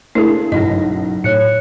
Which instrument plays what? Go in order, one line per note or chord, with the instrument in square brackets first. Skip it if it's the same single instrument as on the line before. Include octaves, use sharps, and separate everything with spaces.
[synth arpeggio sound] A3 G#4 [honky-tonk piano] A#3 D4 C5 [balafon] E4
[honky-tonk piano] F#1 B1 A#6 [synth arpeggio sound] G2 E4 [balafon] D#5
[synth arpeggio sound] A2 [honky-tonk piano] D#4 [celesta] C#5 F#6 C#7